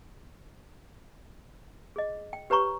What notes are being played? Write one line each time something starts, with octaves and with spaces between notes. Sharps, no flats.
G#4 D#5
G5
G4 B4 C#5 A#5 C#6